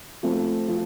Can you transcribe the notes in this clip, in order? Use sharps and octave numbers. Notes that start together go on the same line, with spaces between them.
F3 A3 C4
F3